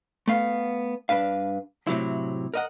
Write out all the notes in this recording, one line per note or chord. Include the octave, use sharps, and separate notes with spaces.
A3 B3 F5
G2 D4 B4 F5
A2 C3 F#3 E4
A#4 D#5 F#5